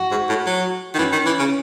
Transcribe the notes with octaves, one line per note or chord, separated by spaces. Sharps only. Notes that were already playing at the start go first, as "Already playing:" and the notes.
Already playing: F#4
G#2
A2
F#3
D#3
E3 C#4
D#3
E3
C#3